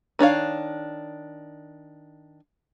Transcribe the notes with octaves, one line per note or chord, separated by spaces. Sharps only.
D#3 D4 C#5 F5